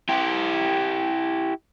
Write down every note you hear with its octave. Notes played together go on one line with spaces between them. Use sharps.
E4 G4